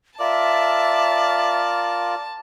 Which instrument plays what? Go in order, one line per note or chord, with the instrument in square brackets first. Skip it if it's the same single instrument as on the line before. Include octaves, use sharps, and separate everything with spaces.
[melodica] F4 A#4 [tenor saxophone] D5 [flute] E5 [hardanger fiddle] A5